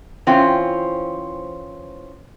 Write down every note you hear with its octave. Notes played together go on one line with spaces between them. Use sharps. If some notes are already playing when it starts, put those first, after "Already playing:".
E3 C4 C#4 F4 C5 G5